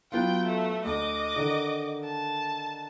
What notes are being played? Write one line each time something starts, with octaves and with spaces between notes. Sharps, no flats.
F#3 B3 F4 G5
A3
D2 D#5 D6
D3 D#3
A5